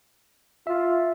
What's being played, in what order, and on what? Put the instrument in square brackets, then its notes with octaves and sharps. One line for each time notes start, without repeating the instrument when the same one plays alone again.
[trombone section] F4 [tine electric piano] E5